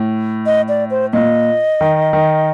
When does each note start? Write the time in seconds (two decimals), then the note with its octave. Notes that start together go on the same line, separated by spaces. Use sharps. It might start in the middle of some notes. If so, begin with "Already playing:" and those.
Already playing: A2
0.46 D#5
0.69 D5
0.91 C5
1.13 A#2 D#5
1.81 D#3
2.13 D#3